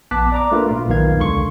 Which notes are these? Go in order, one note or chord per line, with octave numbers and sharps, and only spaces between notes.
A#1 B3 A5 D6 F#6 B6
D5 A#5 D6
A3 A#3 D4 F4 A#4 B4
A#2 F4
B1 E2 D#3 B4 F5 G#6
C#2 D3 C6 C#6